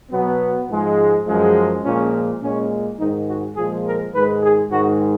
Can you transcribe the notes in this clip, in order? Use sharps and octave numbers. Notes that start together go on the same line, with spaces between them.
B2 F#3 B3
G#2 F3 G#3
F#2 F3 G#3
A#2 F3 G#3 C#4
A#2 G#3 C#4
G#2 D#3 G#3 D#4
F#4
A#2 F3 G#3 G#4
A#4
G#2 D#3 G#3 B4
G#4
G#2 D#3 G#3 F#4